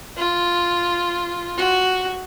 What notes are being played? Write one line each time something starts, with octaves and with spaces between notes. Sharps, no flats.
F4
F#4